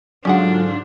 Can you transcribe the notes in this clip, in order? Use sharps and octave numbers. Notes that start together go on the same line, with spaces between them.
G#2 D3 F#3 C#4 D4 F4 G#4 F#5